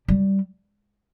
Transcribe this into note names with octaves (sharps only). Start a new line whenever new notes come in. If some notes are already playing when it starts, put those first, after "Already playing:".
G3